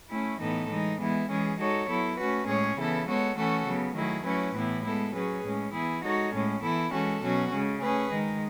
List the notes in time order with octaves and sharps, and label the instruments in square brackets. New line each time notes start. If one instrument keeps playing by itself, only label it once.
[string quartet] A3 C#4 E4
A2 E3 B3 D#4 A4
E3 G#3 D#4
E3 G#3 B3 E4
E3 G#3 C#4 G#4
G#3 D#4 F#4 A4 C#5
F#3 B3 E4 A4
A3 C#4 F#4 B4
A2 G#3 C#4 G#4 C#5
C#3 E3 B3 E4 A4
G#3 B3 F#4 A4 C#5
E3 A3 C#4 F#4 A4
C#3 F#3 B3
D#3 F#3 A3 E4 G#4
F#3 A3 C#4 E4 B4
A2 E3 B3 E4
G#3 B3 E4 A4
F#3 C#4 G#4 B4
A2 G#3 C#4
E3 B3 E4 G#4
G#3 D#4 F#4 A4 C#5
A2 G#3 C#4
E3 B3 E4 A4
E3 G#3 C#4 F#4 A4
B2 F#3 C#4 F#4
C#3 G#3 C#4
A3 C#4 G#4 B4
D#3 G#3 D#4